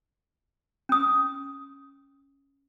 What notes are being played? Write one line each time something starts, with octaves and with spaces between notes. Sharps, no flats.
C#4 D#6